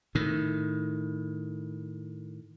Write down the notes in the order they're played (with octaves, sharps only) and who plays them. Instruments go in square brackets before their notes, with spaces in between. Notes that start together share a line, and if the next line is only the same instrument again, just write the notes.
[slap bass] A2 D#3